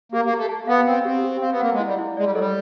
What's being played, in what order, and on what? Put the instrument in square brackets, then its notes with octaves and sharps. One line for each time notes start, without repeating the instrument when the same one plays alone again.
[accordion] A#3 [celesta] G4
[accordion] A#3
[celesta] G4
[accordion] A3
[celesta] A5
[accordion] B3 [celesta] F5
[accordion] C4 [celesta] F5
[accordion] C4 [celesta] G4
[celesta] G4
[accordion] C4 [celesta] F5
[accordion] B3
[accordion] A#3 [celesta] F#5
[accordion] G#3
[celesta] E4
[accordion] G3
[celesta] E4
[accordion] G#3 [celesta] D5
[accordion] G3
F#3
[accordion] G3 [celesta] A4